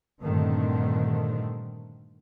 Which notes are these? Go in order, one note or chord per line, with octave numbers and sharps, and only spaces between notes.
G2 A#2 D3 D#3 A3 C4